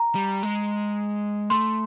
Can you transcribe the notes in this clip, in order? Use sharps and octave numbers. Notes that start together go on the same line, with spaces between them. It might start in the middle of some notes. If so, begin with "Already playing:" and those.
Already playing: A#5
G3
G#3
A3 C6